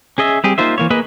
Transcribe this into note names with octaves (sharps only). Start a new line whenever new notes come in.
C#4 G#4 D#5 E5
G3 C4 G4 G#4
A#3 D#4 F4 C5 E5
E3 A#3 C#5
A#3 G#4 B4 D#5 B5